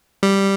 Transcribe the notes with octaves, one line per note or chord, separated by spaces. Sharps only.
G3